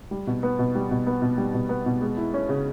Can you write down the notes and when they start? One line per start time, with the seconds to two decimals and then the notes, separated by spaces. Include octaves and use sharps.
0.11 G3
0.27 B2
0.43 B3
0.59 B2
0.75 G3
0.91 B2
1.07 B3
1.22 B2
1.38 G3
1.54 B2
1.69 B3
1.86 B2
2.01 G#3
2.17 E4
2.34 C#4
2.49 C#3